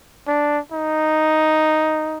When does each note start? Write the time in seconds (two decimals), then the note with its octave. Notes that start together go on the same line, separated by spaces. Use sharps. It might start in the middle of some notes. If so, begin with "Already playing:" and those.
0.27 D4
0.72 D#4